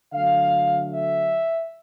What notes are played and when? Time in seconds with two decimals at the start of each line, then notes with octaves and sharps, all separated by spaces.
0.13 D3 F#3 A3 F5
0.92 E5